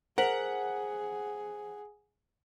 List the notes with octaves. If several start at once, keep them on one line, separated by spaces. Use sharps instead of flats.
G#4 A#4 C5 F#5 B6 F#7